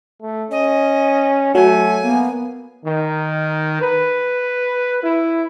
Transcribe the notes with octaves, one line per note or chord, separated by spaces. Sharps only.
A3
C#4 D#5
F#3 A3 G#5
A#3 B3
D#3
B4
E4